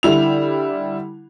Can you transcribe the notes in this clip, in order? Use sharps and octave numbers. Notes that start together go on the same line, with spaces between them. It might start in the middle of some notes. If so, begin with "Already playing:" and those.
D3 G3 E4 F7